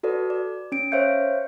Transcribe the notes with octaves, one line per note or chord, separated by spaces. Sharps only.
F#4 A4 B4 D5
D5
C#4 D7
C5 C#5 E5 F5 G6 C#7